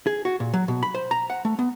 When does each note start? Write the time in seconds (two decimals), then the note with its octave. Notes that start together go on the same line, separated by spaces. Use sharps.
0.07 G#4
0.25 F#4
0.40 A#2
0.53 F#3
0.68 B2
0.83 B5
0.95 C5
1.11 A#5
1.30 F#5
1.45 A3
1.59 B3